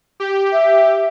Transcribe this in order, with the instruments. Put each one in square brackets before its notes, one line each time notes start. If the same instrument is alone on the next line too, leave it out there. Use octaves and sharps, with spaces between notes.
[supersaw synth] G4
[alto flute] E5